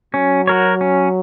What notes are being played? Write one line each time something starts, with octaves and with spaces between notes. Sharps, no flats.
F#3 C#4
F#4 A#4 C#5
C#4